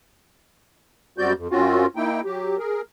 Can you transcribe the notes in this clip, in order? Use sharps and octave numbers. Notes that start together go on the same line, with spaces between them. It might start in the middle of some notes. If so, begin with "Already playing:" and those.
F#2 G3 C4 F#4 D5 G6
F2
F#2 C4 C#4 F4 F#4
A#3 D#4 E4 G5
F#3 G4
G#4 A#4